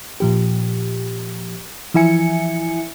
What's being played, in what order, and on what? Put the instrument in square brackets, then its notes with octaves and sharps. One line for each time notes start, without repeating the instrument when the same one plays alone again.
[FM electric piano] A#2 F3 G4
E3 F3 E4 E5 G#5 C#7